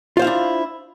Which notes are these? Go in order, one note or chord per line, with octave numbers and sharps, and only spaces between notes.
D4 E4 F4 C5 F5